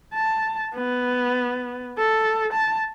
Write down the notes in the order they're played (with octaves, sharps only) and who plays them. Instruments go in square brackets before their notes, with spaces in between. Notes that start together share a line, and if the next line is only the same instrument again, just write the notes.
[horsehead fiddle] A5
B3
A4
A5